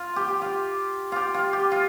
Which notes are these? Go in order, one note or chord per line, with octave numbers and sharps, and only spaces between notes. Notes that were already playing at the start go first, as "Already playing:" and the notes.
Already playing: F4
G4
G4
F4
F4 G4
F4
G4
F4